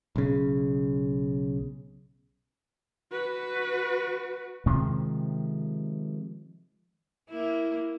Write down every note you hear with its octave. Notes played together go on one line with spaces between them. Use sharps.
B1 C#3
F#4 B4
C3 D#3 F3 G#3
A#3 E4